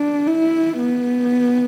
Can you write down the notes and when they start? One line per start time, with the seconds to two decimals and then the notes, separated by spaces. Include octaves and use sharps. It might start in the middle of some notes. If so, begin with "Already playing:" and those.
Already playing: D4
0.27 E4
0.79 B3